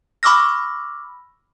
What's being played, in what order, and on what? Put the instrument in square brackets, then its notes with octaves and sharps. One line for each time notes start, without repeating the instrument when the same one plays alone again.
[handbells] B5 C#6 D6 E6 F6 A#6